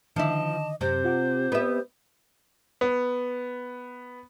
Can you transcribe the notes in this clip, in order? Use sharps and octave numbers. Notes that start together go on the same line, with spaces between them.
D3 D#3 F3 E4 D#5 A5 D6
F#2 C3 G4 C5
F4 F#5 D6
B3 G4 E5
B3